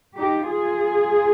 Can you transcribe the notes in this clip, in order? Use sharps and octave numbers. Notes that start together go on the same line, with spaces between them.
D#4 G4
F4 G#4